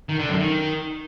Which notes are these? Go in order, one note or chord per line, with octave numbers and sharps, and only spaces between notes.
D#3
D3
F#2
D#3